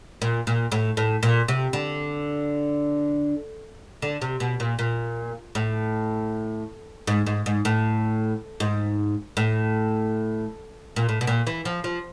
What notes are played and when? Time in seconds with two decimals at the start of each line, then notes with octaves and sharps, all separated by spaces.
0.22 A#2
0.47 A#2
0.72 A2
0.97 A2
1.23 A#2
1.48 C3
1.73 D3
4.02 D3
4.22 C3
4.40 B2
4.60 A#2
4.79 A#2
5.55 A2
7.07 G#2
7.27 G#2
7.46 G#2
7.65 A2
8.60 G#2
9.37 A2
10.96 A#2
11.09 A2
11.21 B2
11.27 A#2
11.47 E3
11.65 F3
11.84 F3